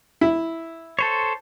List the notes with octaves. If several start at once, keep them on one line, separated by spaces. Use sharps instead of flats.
E4
A4 C5 C#5